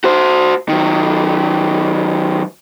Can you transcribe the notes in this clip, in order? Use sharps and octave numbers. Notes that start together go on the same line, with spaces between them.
F#4 C5
D#3 F#3